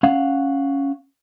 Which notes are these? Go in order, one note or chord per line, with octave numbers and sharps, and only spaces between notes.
C#4 F5 F#5